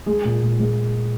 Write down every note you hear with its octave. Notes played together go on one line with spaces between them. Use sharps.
G#3 G#4
A#2
A#2
G#3